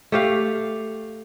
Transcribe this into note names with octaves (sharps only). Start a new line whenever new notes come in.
A3 G4 F5